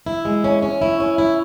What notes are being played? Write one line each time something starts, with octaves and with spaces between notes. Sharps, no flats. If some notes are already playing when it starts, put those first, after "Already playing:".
E4
G#3
C#4
C#4
E4
C#4
E4